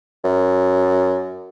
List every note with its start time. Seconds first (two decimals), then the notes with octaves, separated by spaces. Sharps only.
0.24 F#2